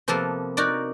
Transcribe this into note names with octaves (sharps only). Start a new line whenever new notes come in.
C3 F3 A#3 B3 A4 A#4
D#4 F#4 A#4 D5